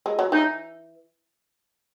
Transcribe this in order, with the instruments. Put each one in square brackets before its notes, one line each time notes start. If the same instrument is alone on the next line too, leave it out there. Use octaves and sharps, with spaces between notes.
[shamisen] G#3
F#3
[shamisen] E3 [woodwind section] D#4